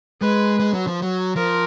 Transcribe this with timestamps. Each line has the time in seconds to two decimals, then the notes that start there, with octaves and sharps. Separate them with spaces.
0.22 G#3 B4
0.60 G#3
0.74 F#3
0.87 F3
1.02 F#3
1.36 F3 A#4